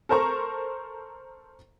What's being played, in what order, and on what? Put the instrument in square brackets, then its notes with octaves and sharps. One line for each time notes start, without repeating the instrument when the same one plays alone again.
[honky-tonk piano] A4 A#4 C5 A#5 C#6